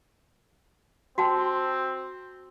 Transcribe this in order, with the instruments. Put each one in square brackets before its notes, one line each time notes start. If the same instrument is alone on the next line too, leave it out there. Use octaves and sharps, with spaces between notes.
[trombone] C4 [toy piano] F#4 G5 A5